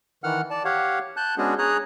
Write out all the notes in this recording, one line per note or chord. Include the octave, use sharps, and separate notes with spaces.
D#3 E3 F#5 F6
D5 A5
G4 C#5 F5 F#5
A5 F#6 G6
G#3 B3 C#4 D4 F#4 G#4
G#4 C#5 A#5 D#6 F#6